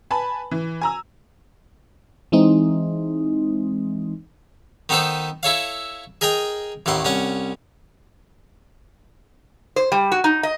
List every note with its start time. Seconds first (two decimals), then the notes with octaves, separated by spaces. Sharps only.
0.10 B4 G#5 A5 B5
0.51 E3
0.81 G#5 A#5 E6
2.32 E3 G#3 C4 D#4
4.89 D#3 B3 D#4 A4 B4 C5
5.43 E4 A4 C#5 F5
6.21 G#4 A#4 D#5 G5 A#5
6.86 A1 D#2 A2 F#5 C6
7.05 C2 C#4 F#5
9.76 C5
9.92 G3
10.12 F#4
10.24 D#4
10.43 D#5